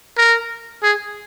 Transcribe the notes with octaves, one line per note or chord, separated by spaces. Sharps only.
A#4
G#4